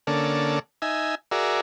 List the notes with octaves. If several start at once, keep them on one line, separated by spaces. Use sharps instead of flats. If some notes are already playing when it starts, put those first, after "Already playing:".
D3 A#3 C#4 A4 D5
D#4 E5 G#5
F#4 G#4 A#4 D5 E5